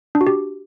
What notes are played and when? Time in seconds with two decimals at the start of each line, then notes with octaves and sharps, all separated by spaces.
0.15 D4
0.21 F#4
0.27 G4